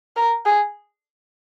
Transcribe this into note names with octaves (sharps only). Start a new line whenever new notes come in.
A#4
G#4